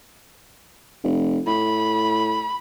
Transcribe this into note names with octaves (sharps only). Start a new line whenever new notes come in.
F1
A2 B5